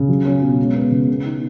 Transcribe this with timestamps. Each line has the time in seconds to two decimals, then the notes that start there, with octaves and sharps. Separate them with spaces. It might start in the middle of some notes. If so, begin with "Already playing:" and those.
Already playing: C#3
0.09 F#3
0.25 C#4
0.42 B2
0.59 G#3
0.75 B3
0.92 C#3
1.08 B3
1.24 D#4